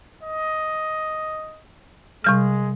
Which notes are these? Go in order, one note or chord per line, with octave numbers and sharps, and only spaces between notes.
D#5
C3 G3 G#3 F6